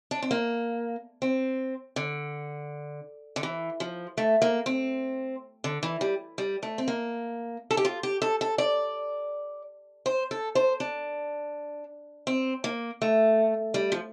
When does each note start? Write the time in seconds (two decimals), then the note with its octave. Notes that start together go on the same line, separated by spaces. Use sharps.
0.11 D4
0.22 C4
0.31 A#3
1.22 C4
1.96 D3
3.36 D3
3.43 E3
3.80 F3
4.17 A3
4.42 A#3
4.66 C4
5.64 D3
5.83 E3
6.01 G3
6.38 G3
6.63 A3
6.78 C4
6.88 A#3
7.71 A4
7.77 G4
7.85 F4
8.03 G4
8.22 A4
8.41 A4
8.58 D5
10.06 C5
10.31 A4
10.55 C5
10.80 D4
12.27 C4
12.64 A#3
13.02 A3
13.74 G3
13.92 F3